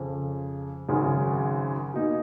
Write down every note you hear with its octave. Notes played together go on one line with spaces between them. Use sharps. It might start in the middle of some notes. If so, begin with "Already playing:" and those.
Already playing: F2 C#3 F3
G#1 F#2 C#3
B2 A#3 D#4